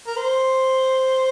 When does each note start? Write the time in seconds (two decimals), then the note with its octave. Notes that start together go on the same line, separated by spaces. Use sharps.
0.07 A#4
0.17 C5